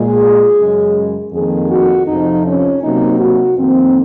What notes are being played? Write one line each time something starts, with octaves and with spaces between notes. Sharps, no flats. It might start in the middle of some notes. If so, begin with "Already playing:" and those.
Already playing: A#2 G#3 G#4
F#2 C#3 G#3
F2 D#3 A#3 G#4
F#4
F2 C3 F3 D#4
C#4
C3 F#3 A#3 D#4
F#4
F2 D#3 A#3 C4